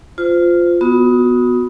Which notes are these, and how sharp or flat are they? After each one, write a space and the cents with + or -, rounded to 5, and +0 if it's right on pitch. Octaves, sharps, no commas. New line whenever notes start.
F4 +0 C5 -30
B3 +0 F#4 -25 D#6 +15